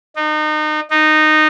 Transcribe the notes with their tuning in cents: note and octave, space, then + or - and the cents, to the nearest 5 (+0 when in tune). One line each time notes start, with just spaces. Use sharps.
D#4 -30
D#4 -15